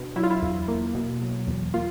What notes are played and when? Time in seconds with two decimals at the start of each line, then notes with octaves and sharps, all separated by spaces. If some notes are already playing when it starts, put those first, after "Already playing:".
Already playing: B2 D4
0.16 F#3 E4
0.23 F4
0.30 E4
0.42 E2
0.68 A#3
0.95 B2
1.22 F#3
1.47 E2
1.74 A#3 F4